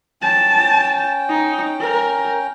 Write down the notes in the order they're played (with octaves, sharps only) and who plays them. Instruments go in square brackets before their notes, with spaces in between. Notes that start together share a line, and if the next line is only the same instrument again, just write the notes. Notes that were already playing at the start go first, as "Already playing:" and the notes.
[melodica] C#4 G5 [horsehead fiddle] A5
[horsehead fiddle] D#4
A#4